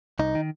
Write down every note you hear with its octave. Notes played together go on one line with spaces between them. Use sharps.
C2 D#4
D#3